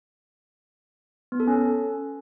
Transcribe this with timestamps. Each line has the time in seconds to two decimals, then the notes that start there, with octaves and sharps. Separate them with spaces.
1.32 B3
1.40 A4
1.48 C#4